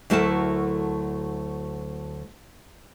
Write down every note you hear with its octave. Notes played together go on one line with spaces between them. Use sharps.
D2 F#3 A3 E4 A#4 A5